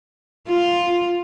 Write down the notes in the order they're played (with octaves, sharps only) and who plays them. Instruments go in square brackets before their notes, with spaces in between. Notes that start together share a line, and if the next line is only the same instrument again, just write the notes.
[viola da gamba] F4